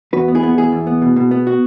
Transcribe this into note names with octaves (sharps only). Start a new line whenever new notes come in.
E2 F#4 B4
B3
E4 G#4
B3
E2 E4 G#4
E2
B3
B2
B2
B3
F#4